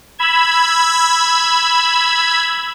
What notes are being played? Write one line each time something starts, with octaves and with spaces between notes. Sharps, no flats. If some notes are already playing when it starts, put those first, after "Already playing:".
B5 E6 G#6